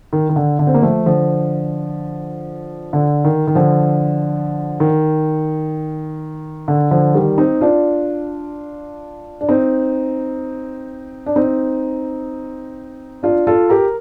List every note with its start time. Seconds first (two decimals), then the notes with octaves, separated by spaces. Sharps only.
0.13 D#3
0.29 D#3
0.36 D3
0.59 D3
0.67 C4
0.74 A#3
0.82 F3 A3
1.06 D3 F3
2.93 D3
3.25 D#3
3.47 D#3
3.55 D3 F3
4.80 D#3
6.68 D3
6.91 D3 F3
7.14 D#3 G3
7.38 C4 D#4
7.61 D4 F4
9.41 D4
9.49 C4 D#4
11.26 D4
11.36 C4 D#4
13.23 D4 F4
13.47 F4 A4
13.70 G4 A#4